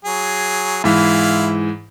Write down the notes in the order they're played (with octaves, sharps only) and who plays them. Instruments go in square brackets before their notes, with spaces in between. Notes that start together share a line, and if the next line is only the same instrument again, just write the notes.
[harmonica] F#3 G#4
[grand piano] G#2 E3 [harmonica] E4 F4 F5